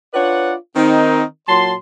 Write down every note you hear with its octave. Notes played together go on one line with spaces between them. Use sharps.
D4 F4 B4 C#5 D5 F#5
D#3 C4 D#4
A#2 F#3 A5 C6